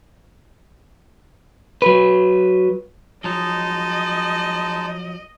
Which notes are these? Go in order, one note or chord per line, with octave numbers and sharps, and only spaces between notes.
F#3 B4
F3 F#3 G#3 D#4 D#5 A5